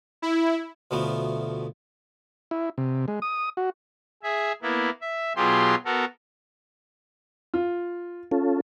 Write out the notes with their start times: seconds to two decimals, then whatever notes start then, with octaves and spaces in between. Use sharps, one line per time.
0.22 E4
0.91 D2 B2 F3 A3 B3
2.51 E4
2.78 C3
3.08 G#3
3.22 D#6
3.57 F#4
4.23 G#4 E5
4.62 A#3 B3 E4
5.01 E5
5.36 B2 F#3 F4 G4 G#4 C6
5.85 B3 F#4 A4 A#4
7.54 F4
8.31 C#4 F4 A4